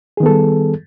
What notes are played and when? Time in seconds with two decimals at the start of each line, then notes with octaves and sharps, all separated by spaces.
0.17 G#4
0.20 D#3
0.23 B3
0.26 A4
0.29 G3